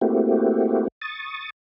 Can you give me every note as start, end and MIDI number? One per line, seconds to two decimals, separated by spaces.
0.01 0.88 57
0.01 0.88 58
0.01 0.88 60
0.01 0.88 64
0.01 0.88 66
0.01 0.88 67
1.02 1.50 85
1.02 1.50 87
1.02 1.50 93